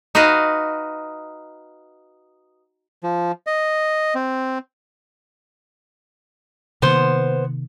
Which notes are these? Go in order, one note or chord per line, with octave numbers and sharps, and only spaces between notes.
D#4 F#4 B4 D#5 F5
F3
D#5
C4
C3 D#3 A#3 B3 C5